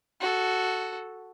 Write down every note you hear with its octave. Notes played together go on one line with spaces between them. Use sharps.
F#4 A4